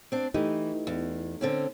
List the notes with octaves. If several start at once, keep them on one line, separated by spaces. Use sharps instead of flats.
C4 D4
E3 A3 D#4 G4
E2
D3 C4 C#4